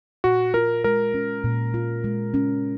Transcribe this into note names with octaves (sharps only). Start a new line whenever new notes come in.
A#2 F#4
F4 A#4
G#3 A#4
C#4
A#2
F4
G#3
C#4